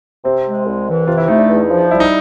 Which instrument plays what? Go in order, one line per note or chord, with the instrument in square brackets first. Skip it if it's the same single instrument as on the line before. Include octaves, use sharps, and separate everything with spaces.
[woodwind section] C3 [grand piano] C4
[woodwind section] G#3
C2
E3
[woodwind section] C3 [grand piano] F4
[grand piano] E4
[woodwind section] A3 [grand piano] D#4
[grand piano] D4
[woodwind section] E2
F3
[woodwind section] G3 [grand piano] E4
[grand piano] D#4